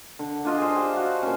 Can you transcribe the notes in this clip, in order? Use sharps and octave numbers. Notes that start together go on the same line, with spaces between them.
D3
D4 F4 D#5
G#4 C5
G4
F#4 F5
A#2 C#4